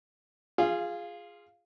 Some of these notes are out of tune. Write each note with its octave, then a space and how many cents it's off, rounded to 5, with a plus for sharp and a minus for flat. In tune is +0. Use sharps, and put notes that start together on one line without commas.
F4 +0 G#4 -10 F5 -25